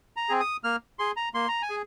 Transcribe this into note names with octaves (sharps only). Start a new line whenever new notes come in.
A#5
C4 G#4
D#6
A#3 F6
G#4 C6
A#5
A#3 C6
A#5
G#5
G#4